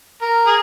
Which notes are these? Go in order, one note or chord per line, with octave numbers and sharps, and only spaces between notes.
A#4
G#4